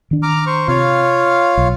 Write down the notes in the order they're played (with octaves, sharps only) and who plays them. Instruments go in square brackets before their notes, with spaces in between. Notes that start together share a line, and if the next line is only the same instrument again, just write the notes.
[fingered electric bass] D#3 D4
[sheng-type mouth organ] A#5 D6 F6
C5 C#6
[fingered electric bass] C3 [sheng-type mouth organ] F4 C#5 F5
[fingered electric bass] B1